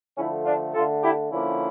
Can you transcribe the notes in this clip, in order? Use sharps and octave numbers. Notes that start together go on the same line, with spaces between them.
D3 F3 A3 C#4 E4
D4 F4
D3 A3 F4 A4
E4 G4
D3 F3 A#3 C#4 E4